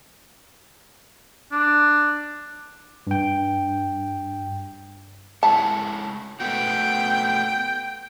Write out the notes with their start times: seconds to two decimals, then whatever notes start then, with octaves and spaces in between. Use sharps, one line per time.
1.52 D4
3.07 G2 G5
5.43 G#3 E4 C#5 A5
6.40 A3 B3 F#4 G5